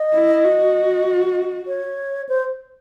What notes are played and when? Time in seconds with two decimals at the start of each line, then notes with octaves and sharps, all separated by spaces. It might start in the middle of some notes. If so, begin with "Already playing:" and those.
Already playing: D#5
0.15 E4
0.45 F#4
1.67 C#5
2.29 C5